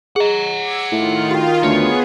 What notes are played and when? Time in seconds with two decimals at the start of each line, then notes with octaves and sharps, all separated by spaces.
0.16 G#4 D#5 F#5 A#5
0.60 D6 E6 G#6
0.92 A2 D#3 F4
1.31 F#4 G5
1.64 D2 B3 G#4 C#5